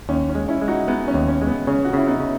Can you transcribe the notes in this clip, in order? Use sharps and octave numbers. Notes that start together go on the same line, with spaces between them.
D#2 C#4
C#4
G#3
C#4 E4
G#3
D#4 F#4
G#3 B3 D#4
C#4
D#2
C#4
G#3
B3
C#3 C#4
F#4
C#3 E4
B3 D#4
C#3